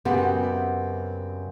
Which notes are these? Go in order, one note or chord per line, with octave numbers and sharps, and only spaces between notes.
F#2 C#3 B3 C4 G4 F#5